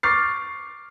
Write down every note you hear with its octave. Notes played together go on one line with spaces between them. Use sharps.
C#6 D6 F6 A6 C7